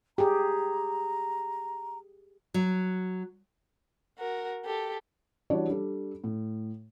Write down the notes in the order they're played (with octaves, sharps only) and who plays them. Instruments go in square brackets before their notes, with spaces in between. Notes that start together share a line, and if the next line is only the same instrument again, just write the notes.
[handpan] G4 G#4 [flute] A#5
[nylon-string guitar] F#3
[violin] F#4 A#4
G4 A4
[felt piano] E3 G3 D4 F#4 C#5 D5
G3 D4 A4
A2